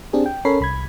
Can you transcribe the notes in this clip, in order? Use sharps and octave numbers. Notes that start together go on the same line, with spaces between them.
C4 D4 G4 G#4
G5
C#4 A4 A#4 C#5 B5 C7
C2 B5 G#6